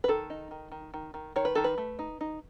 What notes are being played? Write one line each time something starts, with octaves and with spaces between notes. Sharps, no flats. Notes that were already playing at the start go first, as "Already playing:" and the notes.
B4
D#3 A4
D#4
D#3
D#3
D#3
D#3
D#3 C#5
B4
D#3 A4
B4
A3
D#4
D#4